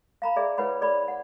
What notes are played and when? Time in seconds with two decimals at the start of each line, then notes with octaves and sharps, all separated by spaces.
0.22 F5 A#5 B5
0.36 G#4 D5 E5
0.58 E4 B4 C#5 F#5 B5
0.81 G#4 D5 B5
1.08 F#5